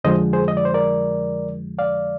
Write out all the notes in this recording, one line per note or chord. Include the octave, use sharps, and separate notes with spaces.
F2 D3 F3 G#3 C5 D#5
G#4 C5
D#5
D5
C5
A#4 D5
D5 F5